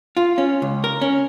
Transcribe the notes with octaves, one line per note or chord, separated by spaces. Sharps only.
F4
C#4
C#2
A#4
C#4